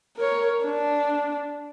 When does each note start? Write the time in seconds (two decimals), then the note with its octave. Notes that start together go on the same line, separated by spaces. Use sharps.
0.17 A#4 C#5
0.65 D4